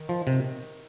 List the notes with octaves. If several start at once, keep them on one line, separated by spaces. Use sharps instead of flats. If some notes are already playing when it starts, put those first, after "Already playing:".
Already playing: D#3
F3
C3